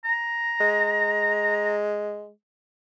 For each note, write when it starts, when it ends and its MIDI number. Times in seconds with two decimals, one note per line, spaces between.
0.04 1.76 82
0.60 2.30 56